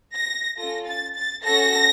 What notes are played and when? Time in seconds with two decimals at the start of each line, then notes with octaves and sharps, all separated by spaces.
0.14 A#6
0.57 C#4 F4 A4 A#6
0.87 A6
1.15 A6
1.43 C#4 F#4 A4 A#6